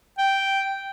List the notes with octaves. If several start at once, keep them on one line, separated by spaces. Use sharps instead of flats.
G5